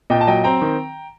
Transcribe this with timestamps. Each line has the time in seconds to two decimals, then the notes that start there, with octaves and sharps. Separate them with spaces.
0.10 A#2 D#5 G5
0.21 A5
0.27 F#3 D#5 G5
0.44 C4 G5 A#5
0.62 D#3